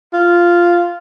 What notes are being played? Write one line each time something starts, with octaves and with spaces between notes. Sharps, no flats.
F4